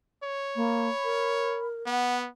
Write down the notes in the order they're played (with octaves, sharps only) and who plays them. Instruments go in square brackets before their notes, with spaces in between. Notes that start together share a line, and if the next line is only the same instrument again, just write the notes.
[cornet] C#5
[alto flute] A#3 [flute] B5
[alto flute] A#4
[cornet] B3 [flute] F#5